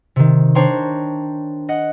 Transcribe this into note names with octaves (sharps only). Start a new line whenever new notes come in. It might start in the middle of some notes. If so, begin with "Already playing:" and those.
C3 D#3
D4 C5 C#5 G5 A#5 C6
D#5 F#5